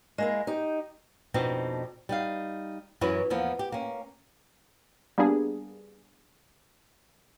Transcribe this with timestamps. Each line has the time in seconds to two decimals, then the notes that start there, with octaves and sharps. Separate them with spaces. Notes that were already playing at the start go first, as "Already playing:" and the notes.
0.18 G#3 A#3 E4
0.47 D#4 G4
1.34 F2 B2 C4 D4 D#4
2.09 G3 D#4 F5
3.01 F#2 E3 E4 B4 C#5
3.30 E2 F3 A#3 B3
3.59 G4
3.72 A#3 C#4
5.18 G3 A#3 B3 D4 G#4